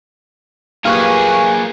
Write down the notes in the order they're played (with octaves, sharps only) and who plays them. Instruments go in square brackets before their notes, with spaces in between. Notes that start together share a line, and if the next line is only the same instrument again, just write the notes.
[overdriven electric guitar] A#2 G#4 [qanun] A#3 G4 B4 [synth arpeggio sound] F5 C#6 F#6